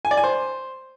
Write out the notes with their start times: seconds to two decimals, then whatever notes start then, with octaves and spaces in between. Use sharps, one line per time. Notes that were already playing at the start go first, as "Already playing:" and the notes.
0.05 G#5
0.11 D5
0.17 G#5
0.24 C5